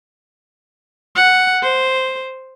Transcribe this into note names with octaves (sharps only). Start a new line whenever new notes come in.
F#5
C5